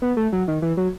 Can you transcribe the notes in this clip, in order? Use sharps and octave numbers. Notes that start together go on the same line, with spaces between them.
B3
A3
F#3
D#3
E3
F#3